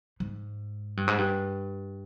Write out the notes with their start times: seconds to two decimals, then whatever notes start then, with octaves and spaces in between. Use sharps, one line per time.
0.20 G#2
0.97 G2
1.07 G#2
1.18 G2